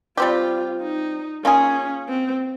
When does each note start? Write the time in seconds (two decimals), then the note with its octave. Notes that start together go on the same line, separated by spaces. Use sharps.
0.17 G3 C4 F4 G4
0.81 D#4
1.44 A#3 C#4 F4 G#4
2.09 C4